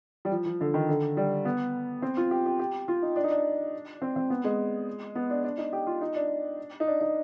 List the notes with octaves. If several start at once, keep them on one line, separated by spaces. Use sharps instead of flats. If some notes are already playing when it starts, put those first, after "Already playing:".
G3
F3
F3
D3
D#3
D3
G3
B3
C4
F4
G4
G4
G4
F4
D#4
D4
D#4
D4
C4
C4
B3
G#3
B3
D4
D4
D#4
G4
F4
D#4
D4
D#4
D4
D#4